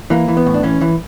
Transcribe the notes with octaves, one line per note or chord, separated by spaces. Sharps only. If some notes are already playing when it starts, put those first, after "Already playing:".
E3 A#3
E3
B3
A2
D4
E3 C#4
E3